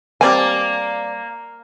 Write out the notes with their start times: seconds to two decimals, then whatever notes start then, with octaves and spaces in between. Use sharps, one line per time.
0.21 G3 A#3 C4 C5 D5 G#5 A5